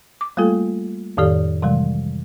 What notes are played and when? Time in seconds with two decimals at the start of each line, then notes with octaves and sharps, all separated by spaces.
0.21 D6
0.37 G3 A3 A#3 F4 A4
1.17 F2 A2 D#3 G4 A4 D5
1.62 C3 E3 G3 G#3